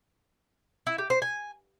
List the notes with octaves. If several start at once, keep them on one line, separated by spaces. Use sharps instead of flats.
E4
G4
C5
G#5